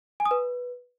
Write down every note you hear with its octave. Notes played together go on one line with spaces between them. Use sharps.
G#5
D#6
B4